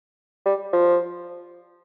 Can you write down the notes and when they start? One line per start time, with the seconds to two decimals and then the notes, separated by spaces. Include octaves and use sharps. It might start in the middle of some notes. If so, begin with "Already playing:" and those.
0.45 G3
0.73 F3